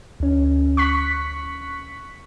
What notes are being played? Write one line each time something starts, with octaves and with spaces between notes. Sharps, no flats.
D2 C#4
C#6 F#6 B6